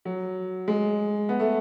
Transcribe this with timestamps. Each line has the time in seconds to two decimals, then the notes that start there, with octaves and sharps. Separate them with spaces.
0.05 F#3
0.68 G#3
1.29 B3
1.39 A3